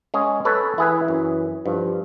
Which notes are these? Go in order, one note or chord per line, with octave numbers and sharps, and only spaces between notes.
G#3 C#4 G#4
A4 B4 C#5
E3 E4 G#4 B4
F#2
G2 F3